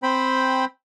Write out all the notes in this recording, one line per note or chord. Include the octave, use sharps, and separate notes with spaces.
C4 C5 G5 B5